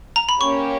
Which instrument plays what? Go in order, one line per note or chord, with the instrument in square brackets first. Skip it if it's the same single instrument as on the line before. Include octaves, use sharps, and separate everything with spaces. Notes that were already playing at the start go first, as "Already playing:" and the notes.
[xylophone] A#5
B5
[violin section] A#3 C#4 G4 C#5 [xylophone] C#6